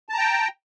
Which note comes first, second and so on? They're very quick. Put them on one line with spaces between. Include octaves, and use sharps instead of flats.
A5 A#5 G5